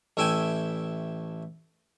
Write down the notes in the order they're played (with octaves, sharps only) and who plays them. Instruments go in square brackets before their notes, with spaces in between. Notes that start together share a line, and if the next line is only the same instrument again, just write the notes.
[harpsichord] A1 A3 E4 E5 G5 G#5